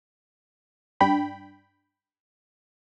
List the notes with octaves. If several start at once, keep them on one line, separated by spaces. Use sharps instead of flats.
G2 D4 G5 B5